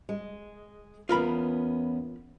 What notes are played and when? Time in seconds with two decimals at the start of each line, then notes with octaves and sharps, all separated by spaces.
0.09 G#3
1.09 E2 B3 C#4 F4 A#4 B5